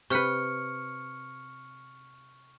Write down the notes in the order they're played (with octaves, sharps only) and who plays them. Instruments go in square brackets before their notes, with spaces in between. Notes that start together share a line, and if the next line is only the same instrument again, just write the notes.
[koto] C3 B4 [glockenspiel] C#6 F6 C#7